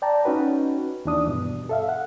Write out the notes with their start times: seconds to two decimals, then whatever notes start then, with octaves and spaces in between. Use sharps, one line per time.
0.02 D5 G5 A5 A#5
0.25 C#4 D#4 F#4 B4
1.05 D#2 E3 D4 D#6
1.27 G2 B2
1.69 A4 E5 F5
1.89 F#5